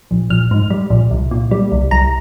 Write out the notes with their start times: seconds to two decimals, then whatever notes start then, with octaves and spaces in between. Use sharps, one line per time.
0.11 A#1
0.30 A#1 F6
0.51 G#2
0.70 G3
0.90 A#1
1.11 C2
1.31 A#2
1.51 G3
1.72 C2
1.91 C2 A#5